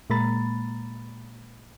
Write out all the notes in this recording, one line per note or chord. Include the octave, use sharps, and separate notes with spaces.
A#2 G#3 A#3 A#5 B5 A6